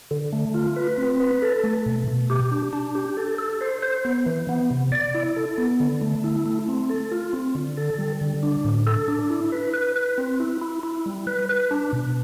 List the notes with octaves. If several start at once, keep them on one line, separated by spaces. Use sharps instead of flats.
D3
A3
F4
B4
C4
B4
A4
A3
B2
B2
G4
D4
D4
G4
A4
A4
C5
C5
B3
E3
B3
C3
D5
E4
A4
B3
D3
A3
E4
A3
C4
A4
F4
C4
D3
A4
G3
D3
D4
A2
A4
D4
E4
B4
B4
B4
C4
E4
E4
E4
G3
B4
B4
D4
B2